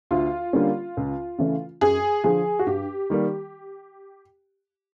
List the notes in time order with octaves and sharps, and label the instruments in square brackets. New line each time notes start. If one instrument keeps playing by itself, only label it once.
[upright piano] D2 [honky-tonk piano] F4
[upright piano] D3 G3 A#3 C#4
C#2
C#3 E3 A3 C#4
[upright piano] F#2 [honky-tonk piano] G#4
[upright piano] D3 F3 [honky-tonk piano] G#4
[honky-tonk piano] F#4
[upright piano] G2 [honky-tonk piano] G4
[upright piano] D#3 G3 A#3